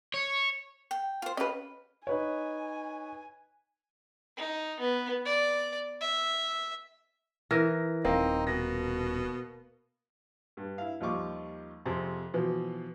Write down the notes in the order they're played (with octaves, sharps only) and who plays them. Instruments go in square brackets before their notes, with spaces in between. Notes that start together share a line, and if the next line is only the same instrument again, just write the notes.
[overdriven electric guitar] C#5
[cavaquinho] G5
F4 C5
[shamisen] C#4 B4 [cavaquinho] D#5 F5
[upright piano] D#4 B4 C#5 [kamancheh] G#5
[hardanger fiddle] D#4
B3
D5
E5
[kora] E3 A#4 [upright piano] A#6
[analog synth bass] D#1 [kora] A#3 [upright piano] C4 [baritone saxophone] D#4
[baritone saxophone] B2 [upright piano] A#6
[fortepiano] G2
E4 F5
D#2 F3 G3 F4 C#6 D6
F2 C3 G#4
B2 E3 F3